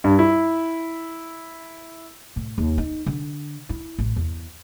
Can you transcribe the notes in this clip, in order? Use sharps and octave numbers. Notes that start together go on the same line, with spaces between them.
G2
E4
A2
D#2
D#4
D3
E4
A1
E2